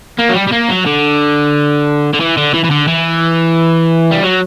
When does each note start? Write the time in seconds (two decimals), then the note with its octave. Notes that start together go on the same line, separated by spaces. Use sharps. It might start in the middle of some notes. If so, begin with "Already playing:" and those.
0.18 A#3
0.29 F#3
0.35 G3
0.47 G3
0.52 A#3
0.69 F#3
0.86 D3
2.14 D3
2.20 E3
2.37 D3
2.54 E3
2.64 E3
2.71 D3
2.88 E3
4.11 G3
4.23 F#3